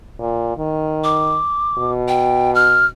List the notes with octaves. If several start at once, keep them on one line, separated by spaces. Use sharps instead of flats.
A#2
D#3
D6
B2
G5
F6